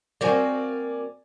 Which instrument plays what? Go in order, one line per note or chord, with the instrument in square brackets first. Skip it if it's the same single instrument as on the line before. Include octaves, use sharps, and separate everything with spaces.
[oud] A#3 C4 F#4 [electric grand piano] D5 G#5